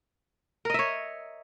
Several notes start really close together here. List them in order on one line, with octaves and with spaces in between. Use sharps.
A#4 D#5 E5 C#5